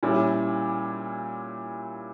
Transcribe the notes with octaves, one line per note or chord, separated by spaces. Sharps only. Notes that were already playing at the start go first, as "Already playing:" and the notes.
A#2 G3 C#4 E4